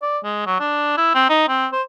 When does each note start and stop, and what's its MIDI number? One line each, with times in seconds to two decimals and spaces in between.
0.02 0.18 74
0.24 0.43 56
0.46 0.55 54
0.60 0.96 62
0.97 1.10 64
1.15 1.25 60
1.29 1.48 63
1.48 1.67 60
1.72 1.82 72